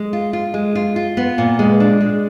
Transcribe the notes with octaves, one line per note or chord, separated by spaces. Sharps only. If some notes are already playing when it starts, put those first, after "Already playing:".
Already playing: G#3
F4
F4
G#3
F4
F4
B3
A#2
G#3
D4
G#3